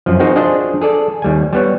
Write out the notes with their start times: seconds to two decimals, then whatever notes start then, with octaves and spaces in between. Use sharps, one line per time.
0.06 F#2 F3
0.20 C4 D#4 F#4 G#4 A#4
0.36 D4 F4 G#4 C5 D#5
0.81 G#4 A4 D5
1.22 D#2 G3 G#5
1.53 G3 B3 C#5